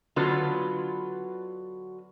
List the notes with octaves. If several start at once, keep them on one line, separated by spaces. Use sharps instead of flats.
D3 F#3 B3 F4 B4